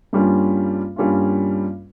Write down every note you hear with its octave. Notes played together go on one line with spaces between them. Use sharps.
G2 G3 A#3 C#4 F4
G2 G3 A#3 C#4 F4